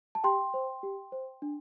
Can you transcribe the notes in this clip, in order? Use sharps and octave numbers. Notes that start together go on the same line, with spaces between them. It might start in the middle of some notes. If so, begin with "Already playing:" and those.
A5
G4 G5 C6
C5
G4
C5
D4